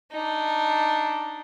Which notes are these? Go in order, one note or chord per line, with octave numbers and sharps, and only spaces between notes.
D4 D#4